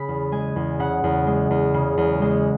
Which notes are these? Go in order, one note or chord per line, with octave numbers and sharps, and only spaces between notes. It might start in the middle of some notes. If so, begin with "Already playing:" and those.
Already playing: C#3 B5
E2
G#3 G#5
E2
C#3 F#5
E2
G#3
E2
C#3
E2
G#3